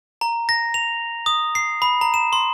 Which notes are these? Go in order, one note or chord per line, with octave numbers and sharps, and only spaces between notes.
A#5
A#6
F7
D#6
C7
B5
A#5
E7
C6